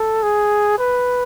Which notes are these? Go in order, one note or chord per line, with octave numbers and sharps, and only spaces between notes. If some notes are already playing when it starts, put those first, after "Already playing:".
Already playing: A4
G#4
B4